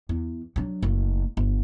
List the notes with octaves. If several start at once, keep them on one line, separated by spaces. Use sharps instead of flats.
E2
F#3 D4
F#1 A3
G1